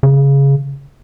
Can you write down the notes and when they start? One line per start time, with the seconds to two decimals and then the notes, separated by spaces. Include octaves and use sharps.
0.03 C#3